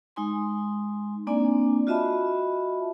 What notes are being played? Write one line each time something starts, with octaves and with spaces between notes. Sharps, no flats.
G#3 D#4 G#5 C6
A#3 C4 D4 D5 G#5
F4 F#4 D#5 E5 A5 B5